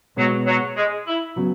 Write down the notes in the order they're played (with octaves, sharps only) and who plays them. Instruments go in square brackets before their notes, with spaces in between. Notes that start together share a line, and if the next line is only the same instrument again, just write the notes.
[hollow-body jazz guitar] B2 G#3 B3 [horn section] F#3
[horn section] F#3
G#3
E4
[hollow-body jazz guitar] C#3 F#3 B3 F#4